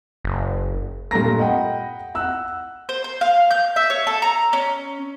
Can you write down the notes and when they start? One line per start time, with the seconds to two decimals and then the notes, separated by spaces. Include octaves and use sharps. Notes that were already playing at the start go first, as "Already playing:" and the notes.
0.25 F#1
1.11 G2 A#2 A3 A#5 A#6
1.39 D#5 F#5 G5 B5
2.15 F#5 E6 F#6
2.89 C5
3.04 C5
3.21 F5
3.51 G6
3.76 E5
3.90 C#5
4.07 A4
4.22 A#5
4.53 C#4